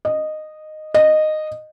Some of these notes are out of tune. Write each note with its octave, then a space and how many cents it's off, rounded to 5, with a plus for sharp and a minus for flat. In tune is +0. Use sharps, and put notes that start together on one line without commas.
D#5 -10
D#5 -10